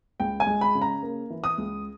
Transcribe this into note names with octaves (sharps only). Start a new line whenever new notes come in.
C#2 G5
G#5
G#3
B5
C#3
A#5
A#3
E3
D#6
C#2